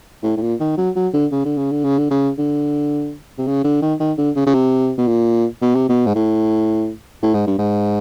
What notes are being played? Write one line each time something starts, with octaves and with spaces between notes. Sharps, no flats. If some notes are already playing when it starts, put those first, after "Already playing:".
A2
A2
A#2
D#3
F#3
F#3
D3
C#3
D3
C#3
D3
C#3
D3
C#3
D3
C3
C#3
D3
D#3
D#3
D3
C#3
C#3
C3
B2
A#2
B2
C3
B2
G#2
A2
A2
G#2
G2
G#2